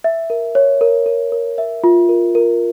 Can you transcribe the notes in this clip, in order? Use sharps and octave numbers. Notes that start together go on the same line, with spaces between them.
E5
A#4
C#5
A#4
A#4
A#4
E5
F4
A#4
A#4